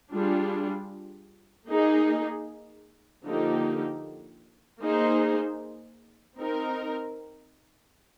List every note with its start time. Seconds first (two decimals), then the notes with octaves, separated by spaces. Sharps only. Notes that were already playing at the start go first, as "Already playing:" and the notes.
0.12 G3 D4 F4 G#4
1.68 A#3 D#4 G#4
3.25 D3 F3 A#3 D#4 G4
4.81 A#3 D#4 G#4 C5
6.38 C4 D#4 A#4